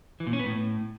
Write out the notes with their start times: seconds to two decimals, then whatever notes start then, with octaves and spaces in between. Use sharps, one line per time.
0.20 E3
0.27 A#2
0.33 C#4
0.40 B3
0.46 A2